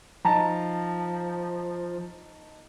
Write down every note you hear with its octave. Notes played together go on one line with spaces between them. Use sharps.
F3 D#4 A5 A#5